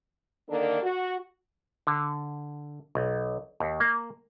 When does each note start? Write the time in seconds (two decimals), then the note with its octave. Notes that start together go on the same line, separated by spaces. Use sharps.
0.48 D3 D#3 A#3 D4 A4 A#4
0.81 F#4
1.87 D3
2.95 B1
3.60 D#2
3.80 A#3